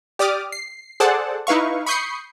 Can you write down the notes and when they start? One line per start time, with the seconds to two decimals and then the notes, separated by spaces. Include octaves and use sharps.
0.19 G4 D5 D6 D#6 F6
0.52 C7
1.00 G#4 A4 C5 D5 F#5 A5
1.47 D#4 E4 B4 F5 C#6
1.86 B5 C#6 D#6 G6 C7 C#7